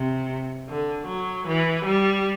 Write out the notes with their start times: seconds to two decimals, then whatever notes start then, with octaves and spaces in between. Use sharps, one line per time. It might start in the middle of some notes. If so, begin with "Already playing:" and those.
Already playing: C3
0.70 D3
1.07 F#3
1.46 E3
1.84 G3